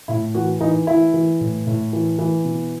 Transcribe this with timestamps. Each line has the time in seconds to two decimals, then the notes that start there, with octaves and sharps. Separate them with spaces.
0.08 A2 E4
0.34 E3 F#4
0.60 E3 D#4
0.87 E3 E4
1.14 E3
1.41 A2
1.67 A2
1.93 E3
2.19 E3
2.45 B2